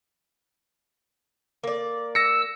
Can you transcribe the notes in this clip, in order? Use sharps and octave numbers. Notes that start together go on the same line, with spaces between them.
A#3 D5
E6 A#6 C#7